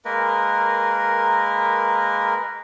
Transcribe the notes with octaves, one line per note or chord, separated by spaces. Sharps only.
G#3 A#3 A#4 B4